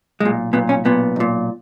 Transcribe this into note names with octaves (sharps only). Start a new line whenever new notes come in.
B1 A#2 G#3
B1 A#2 B3
C#4
B1 A#2 B3
B1 A#2